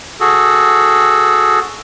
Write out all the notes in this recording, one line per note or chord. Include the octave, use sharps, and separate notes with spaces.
F#4 G#4 A4